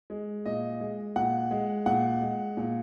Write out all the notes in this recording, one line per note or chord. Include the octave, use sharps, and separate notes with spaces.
G#3
A#2 D#5
G#3
A#2 F#5
G#3
A#2 F#5
G#3
A#2